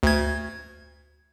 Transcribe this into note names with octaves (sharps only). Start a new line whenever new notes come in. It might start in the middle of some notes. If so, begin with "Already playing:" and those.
D2 G#6